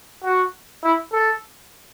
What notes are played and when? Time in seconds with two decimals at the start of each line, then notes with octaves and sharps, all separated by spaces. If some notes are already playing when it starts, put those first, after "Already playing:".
0.24 F#4
0.83 E4
1.13 A4